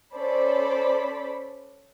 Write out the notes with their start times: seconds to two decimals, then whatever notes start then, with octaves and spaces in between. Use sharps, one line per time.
0.15 C#4 A4 C5 D5 B5